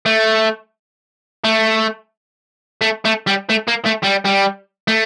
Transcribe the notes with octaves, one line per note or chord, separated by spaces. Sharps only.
A3
A3
A3
A3
G3
A3
A#3
A3
G3
G3
A3